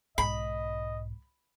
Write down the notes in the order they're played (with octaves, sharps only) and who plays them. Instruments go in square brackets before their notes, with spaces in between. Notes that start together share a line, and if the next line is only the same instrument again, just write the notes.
[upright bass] B1 G#2 [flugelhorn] D#5 [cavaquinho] B5